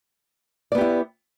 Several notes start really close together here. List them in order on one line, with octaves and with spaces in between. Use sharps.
D5 B3 G4 E4